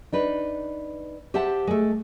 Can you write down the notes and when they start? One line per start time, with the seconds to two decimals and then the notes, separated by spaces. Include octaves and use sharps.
0.12 D4 D#4 B4
1.34 G4 C5 E5 F#5 A5
1.67 G#3 A3